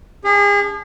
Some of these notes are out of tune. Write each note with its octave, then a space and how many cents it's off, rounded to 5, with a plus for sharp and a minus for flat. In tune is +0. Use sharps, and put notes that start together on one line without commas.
D4 -45 G#4 -35